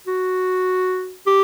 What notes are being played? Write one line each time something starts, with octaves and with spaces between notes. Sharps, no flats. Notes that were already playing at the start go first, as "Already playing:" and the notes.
F#4
G4